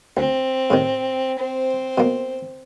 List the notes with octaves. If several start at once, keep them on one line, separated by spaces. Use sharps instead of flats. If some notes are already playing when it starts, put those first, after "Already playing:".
D2 C4
A2 C3 D#3
C4 C5
B2 A#3